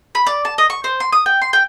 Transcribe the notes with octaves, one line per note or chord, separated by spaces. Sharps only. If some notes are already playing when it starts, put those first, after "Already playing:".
B5
D5
A5
D#5
C#6
C5
C6
D#6
G5
C6
G5